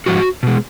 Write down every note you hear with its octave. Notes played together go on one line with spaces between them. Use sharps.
G#2 F3 F#4
B2 G#3